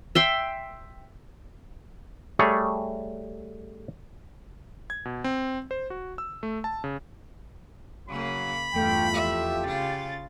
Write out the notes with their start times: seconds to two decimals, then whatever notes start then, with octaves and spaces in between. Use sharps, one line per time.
0.15 E5 G5 C6
2.39 G3 A3 G#4 C#5
4.90 G#6
5.05 B2
5.24 C4
5.71 C5
5.90 F#4
6.18 E6
6.43 A3
6.64 A5
6.84 C#3
8.09 C#3 F#3 A#3 B5
8.74 E2 G2 A3 F4 G5
9.14 F2 G4 E5
9.63 C#3 F4 A6